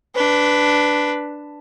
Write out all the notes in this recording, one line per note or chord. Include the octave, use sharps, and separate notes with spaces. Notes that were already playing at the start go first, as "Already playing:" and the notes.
D4 B4